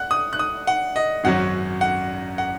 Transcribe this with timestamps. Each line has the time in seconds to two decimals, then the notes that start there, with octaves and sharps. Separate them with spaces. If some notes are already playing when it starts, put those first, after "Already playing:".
Already playing: F#5 F#6
0.11 D#6
0.33 F#6
0.39 D#6
0.67 F#5
0.96 D#5
1.24 G#1 F#2 F#3 C#4 F#5
1.81 F#5
2.38 F#5